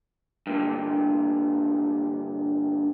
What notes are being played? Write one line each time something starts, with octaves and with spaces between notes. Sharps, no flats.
G2 A#2 D3